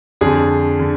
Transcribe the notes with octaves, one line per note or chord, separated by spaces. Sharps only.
F2 D3 G#4
D3